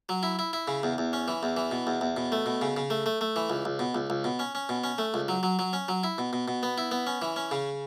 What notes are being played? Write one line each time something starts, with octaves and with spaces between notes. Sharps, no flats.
F#3
E4
E4
E4
C#3
E2
E2
C#4
E3
E2
E3
B2
E2
E2
B2
A3
B2
C#3
C#3
A3
A3
A3
E3
C#2
C#2
B2
C#2
C#2
B2
C#4
C#4
B2
C#4
A3
C#2
F#3
F#3
F#3
C#4
F#3
E4
B2
B2
B2
B3
E4
B3
C#4
E3
C#4
C#3